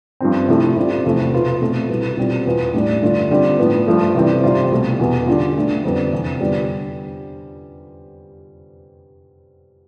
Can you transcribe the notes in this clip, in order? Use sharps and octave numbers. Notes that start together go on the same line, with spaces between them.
G2 F3 C4
C3 F3 A3 E4
C3 G3 C4 F4
E2 C3 F3 A3 E4
B2 B3 F4
B2 A3 C4
C2 B2 B3 E4
B2 G3 C4 F4
E2 B2 B3 F4
A2 G3 D4
G2 D3 A3 D4 F4
D3 G3 C4 F4
A2 F3 B3
G2 F3 A3
C3 E3 G3 C4
C3 G3 C4 F4
C2 B2 A3
E2 B2 B3
D3 G3 D4 F4
D3 A3 D4
F2 D3 G3 B3
E2 C3 E3
D3 G3 B3 F4